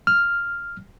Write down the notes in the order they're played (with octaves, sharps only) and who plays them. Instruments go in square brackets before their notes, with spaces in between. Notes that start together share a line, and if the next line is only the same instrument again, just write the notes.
[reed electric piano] F6